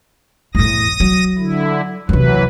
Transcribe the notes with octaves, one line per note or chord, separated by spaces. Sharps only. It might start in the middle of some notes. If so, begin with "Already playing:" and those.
E2 A2 D#6 A#6
F#3
D3 E4
D#2 C3 E3 F#3 B4